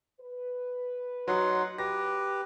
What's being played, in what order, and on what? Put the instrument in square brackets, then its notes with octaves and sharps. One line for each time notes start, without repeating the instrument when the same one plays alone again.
[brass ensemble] B4
[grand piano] F#3 [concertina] D#4 F#5 C6
[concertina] G4 B4 [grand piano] A#6